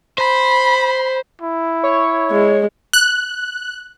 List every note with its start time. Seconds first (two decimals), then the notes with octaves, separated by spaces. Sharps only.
0.18 C5 B5
1.42 E4
1.83 C#5
2.32 G#3
2.93 F#6